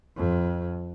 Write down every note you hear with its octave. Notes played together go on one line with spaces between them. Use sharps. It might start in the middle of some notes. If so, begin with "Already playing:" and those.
F2